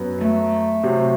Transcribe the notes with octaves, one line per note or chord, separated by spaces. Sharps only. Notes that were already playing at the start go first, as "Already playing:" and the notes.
Already playing: F#2 F#3 B3
A3
C3 F#3 C4